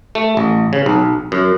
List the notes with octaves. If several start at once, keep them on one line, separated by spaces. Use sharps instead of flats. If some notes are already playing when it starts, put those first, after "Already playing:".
A3
A1
C#3
B1
F#2